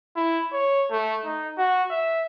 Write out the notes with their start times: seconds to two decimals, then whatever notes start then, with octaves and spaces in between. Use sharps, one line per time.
0.16 E4
0.53 C#5
0.90 A3
1.25 D#4
1.58 F#4
1.91 E5